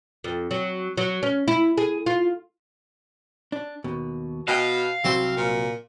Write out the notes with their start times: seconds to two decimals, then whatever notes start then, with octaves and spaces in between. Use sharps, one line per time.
0.24 F2
0.51 F#3
0.98 F#3
1.23 C#4
1.48 E4
1.78 G#4
2.06 F4
3.52 D4
3.84 D#2 B2
4.48 B2 D#5 F5 G5
5.04 C2 F#3 C4 C6
5.37 A#2